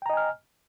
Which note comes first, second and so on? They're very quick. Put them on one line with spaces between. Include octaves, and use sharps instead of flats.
G5 A#5 D#5 G#5 F6